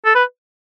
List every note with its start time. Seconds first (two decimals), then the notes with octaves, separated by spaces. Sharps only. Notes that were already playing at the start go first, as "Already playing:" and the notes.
0.05 A4
0.15 B4